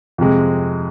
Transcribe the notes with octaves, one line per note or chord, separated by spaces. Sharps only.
F2 C3 G#3